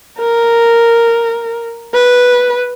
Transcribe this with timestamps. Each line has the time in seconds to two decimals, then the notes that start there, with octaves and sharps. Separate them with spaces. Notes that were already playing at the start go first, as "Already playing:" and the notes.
0.18 A#4
1.94 B4